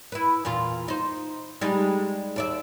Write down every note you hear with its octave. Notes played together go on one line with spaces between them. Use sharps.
E4 B4
E2 A#2 F4
D#4 C5
G3 G#3 D#4
D#2 D5 E5